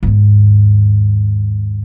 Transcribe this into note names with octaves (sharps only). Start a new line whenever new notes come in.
D#2 G#2